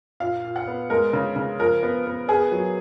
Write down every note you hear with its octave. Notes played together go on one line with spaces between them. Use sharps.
A#2 F5
A#2
F#5
B3
G#3 A#4
C#3
C#3
F3 A#4
B3
B3
B3 G#4
F#3